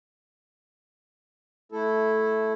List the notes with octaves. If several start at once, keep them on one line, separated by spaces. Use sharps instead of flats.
A3 E4 A4